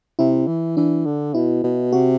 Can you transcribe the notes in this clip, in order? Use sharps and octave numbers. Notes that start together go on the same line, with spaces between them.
C3 E4
E3
E3 D4
D3
B2 E4
B2
C3 F#4